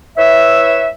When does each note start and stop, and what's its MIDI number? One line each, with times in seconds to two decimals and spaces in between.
0.18 0.90 64
0.18 0.90 71
0.18 0.90 73
0.18 0.90 76